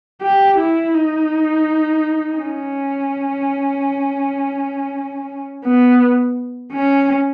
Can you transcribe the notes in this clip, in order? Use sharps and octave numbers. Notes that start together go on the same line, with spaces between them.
G4
E4
D#4
C#4
B3
C#4